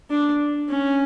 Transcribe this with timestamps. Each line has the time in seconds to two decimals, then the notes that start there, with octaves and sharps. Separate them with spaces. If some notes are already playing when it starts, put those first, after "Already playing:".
0.11 D4
0.69 C#4